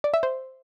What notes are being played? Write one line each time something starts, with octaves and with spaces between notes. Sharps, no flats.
D5
E5
C5